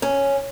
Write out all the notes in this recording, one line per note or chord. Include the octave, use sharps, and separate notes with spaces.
C#4